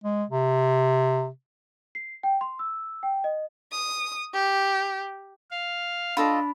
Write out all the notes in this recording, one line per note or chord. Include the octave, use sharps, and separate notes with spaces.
G#3
C3
C7
G5
C6
E6
G5
D#5
D#6
G4
F5
D4 F4 A4 D#5 B5